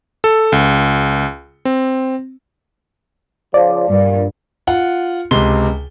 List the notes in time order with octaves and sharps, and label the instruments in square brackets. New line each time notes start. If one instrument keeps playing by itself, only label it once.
[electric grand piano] A4
C#2
C4
[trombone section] C#3 F3 [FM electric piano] D5
[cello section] G2 [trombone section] A#2
[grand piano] F4 F#5
C#2 C3 C6 G7